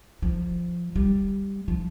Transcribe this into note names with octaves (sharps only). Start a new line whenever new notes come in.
F3
G3
F3